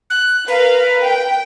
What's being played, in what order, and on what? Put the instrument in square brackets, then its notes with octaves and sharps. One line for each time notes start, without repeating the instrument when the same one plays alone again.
[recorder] F#6
[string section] A#4 F5 [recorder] B4
[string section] G5